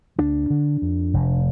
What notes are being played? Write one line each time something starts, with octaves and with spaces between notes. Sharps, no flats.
D2 D4
D3
F2
F1